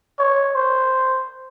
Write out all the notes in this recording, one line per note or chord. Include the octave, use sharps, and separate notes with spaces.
C#5
C5